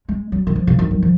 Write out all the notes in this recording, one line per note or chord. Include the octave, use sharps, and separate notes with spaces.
G#3
F#3
D#3
F3
C#3
D#3
F#3
F3